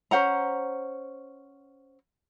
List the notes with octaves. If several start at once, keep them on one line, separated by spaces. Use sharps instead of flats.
C#4 C5 F#5 A#5